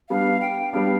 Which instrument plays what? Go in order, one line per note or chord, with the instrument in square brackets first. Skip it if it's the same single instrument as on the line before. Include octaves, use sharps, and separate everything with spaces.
[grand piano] G3 B3 D4 [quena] F5
[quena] G5
[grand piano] G3 B3 D4 [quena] F5